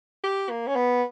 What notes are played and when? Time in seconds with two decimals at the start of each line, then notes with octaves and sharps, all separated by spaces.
0.24 G4
0.50 A#3
0.67 C#4
0.76 B3